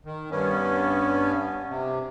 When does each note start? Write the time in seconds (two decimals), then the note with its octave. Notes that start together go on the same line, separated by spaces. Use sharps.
0.05 D#3
0.31 G2 B3 C#4
1.69 C3